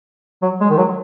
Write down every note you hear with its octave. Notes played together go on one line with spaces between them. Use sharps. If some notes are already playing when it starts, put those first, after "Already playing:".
F#3
G#3
D#3
F#3